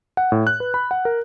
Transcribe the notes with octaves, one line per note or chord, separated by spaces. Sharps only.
F#5
A2
F#6
B4
B5
F#5
A#4